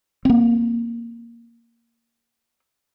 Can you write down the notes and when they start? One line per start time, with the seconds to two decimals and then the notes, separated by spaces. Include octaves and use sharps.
0.25 A#3 C4